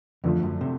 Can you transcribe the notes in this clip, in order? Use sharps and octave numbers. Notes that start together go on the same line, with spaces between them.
F2 D3 F3 A3
F#2
C3